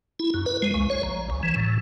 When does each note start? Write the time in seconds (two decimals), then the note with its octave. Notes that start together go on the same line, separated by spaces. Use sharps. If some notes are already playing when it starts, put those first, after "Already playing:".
0.19 E4
0.34 F#2
0.46 B4
0.62 G#3
0.74 C#2
0.90 C#5
1.03 A#1
1.30 C#2
1.43 E3
1.56 A2